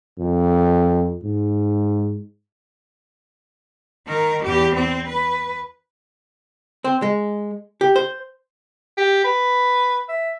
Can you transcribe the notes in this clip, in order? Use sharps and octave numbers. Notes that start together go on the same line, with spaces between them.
F2
G#2
D#3 A#4
E2 G4
C4
B4
C4
G#3
G4
C5
G4
B4
E5